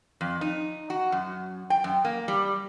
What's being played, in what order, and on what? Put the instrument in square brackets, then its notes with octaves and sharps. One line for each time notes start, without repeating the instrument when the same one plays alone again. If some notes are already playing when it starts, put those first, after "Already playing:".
[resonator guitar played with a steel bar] F2
D#4
F#4
F#2
G5
F#2
A#3
G3